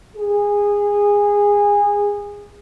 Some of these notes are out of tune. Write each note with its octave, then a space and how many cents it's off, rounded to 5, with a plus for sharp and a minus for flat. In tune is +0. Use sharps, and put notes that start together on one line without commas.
G#4 -20